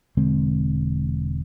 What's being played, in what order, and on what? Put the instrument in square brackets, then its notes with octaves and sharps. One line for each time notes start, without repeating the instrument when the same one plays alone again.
[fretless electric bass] E1 D3 G#3 C4